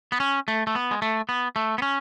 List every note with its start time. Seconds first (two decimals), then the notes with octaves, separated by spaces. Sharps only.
0.12 B3
0.20 C#4
0.48 A3
0.67 A3
0.75 B3
0.91 G#3
1.02 A3
1.29 B3
1.56 A3
1.78 B3
1.82 C#4